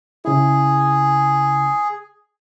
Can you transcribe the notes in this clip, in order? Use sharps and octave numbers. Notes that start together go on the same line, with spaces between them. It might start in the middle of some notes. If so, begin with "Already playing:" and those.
C#3 E4 G#4